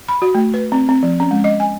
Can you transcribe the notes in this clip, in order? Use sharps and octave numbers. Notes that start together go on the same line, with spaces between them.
B5
F#4
A3
B4
C4
C4
F3
C#4
G#3
D#5
G#5